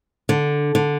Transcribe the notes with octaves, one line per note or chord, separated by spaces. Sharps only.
D3
D3